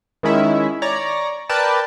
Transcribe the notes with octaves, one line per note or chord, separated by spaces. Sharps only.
D#3 G#3 C#4 E4
C#5 D5 A#5
A#4 B4 D5 G5 A5